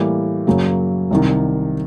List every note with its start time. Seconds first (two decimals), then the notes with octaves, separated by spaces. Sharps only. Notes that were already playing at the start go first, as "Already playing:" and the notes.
Already playing: A2 E3 G3 A#3
0.47 F#2 C#3 F#3 A#3
1.11 C2 C3 D#3